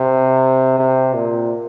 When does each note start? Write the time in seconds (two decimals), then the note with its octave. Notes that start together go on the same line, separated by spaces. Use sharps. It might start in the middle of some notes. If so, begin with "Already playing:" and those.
Already playing: C3
0.79 C3
1.14 A#2